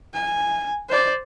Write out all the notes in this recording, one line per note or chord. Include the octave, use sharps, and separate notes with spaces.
G#5
C5 D5